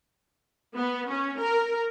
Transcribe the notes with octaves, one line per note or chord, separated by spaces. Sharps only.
B3
C#4
A#4